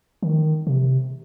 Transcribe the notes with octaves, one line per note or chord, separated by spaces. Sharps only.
D#3
C3